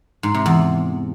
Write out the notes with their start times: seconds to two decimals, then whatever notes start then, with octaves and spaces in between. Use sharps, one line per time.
0.23 G#2
0.34 C3
0.46 E2